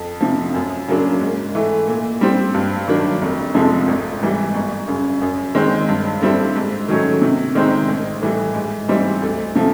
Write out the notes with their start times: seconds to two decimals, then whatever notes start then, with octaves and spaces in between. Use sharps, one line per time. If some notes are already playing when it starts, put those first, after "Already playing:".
Already playing: F2
0.21 C3 F3
0.54 F#2
0.88 C#3 F#3 A#3 D4
1.21 G#2
1.55 E3 A3
1.88 A#2
2.21 G3 C4
2.55 G2
2.88 D#3 F#3 A#3 D4
3.21 F1
3.54 F2 C3 F3 G#3
3.88 G#1
4.22 G#2 E3 G3
4.55 G1
4.88 F#2 C#3
5.22 F#2
5.55 D#3 G#3 C4
5.89 G2
6.22 D3 G3 C4 E4
6.56 G#2
6.88 D#3 F#3 A3 C#4
7.22 C3
7.55 D#3 G#3 C4 D#4
7.88 A1
8.22 A2 E3 G3
8.55 G#2
8.88 E3 G3 C4 D#4
9.22 D2
9.55 C3 F3 A3